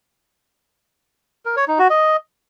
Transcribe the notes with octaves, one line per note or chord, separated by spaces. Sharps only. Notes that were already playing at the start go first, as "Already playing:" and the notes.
A#4
C#5
D#4
F#4
D#5